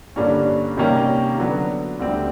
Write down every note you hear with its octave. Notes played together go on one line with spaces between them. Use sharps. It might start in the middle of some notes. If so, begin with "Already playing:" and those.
G2 D3 G3 A#3 C#4
C3 D#3 G3 A#3 C#4
D3 F#3 B3
D2 D3 G3 C4